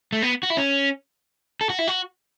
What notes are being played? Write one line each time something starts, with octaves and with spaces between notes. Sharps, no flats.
A3
B3
F#4
E4
C#4
A4
F#4
E4
F#4